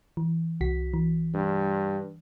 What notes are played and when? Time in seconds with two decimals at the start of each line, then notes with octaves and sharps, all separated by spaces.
0.17 E3
0.61 C2 F#4 B6
0.94 E3
1.34 G2